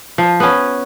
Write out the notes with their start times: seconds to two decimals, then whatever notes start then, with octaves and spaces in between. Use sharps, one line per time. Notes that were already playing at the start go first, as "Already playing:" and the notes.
0.18 F3
0.40 B3 C#4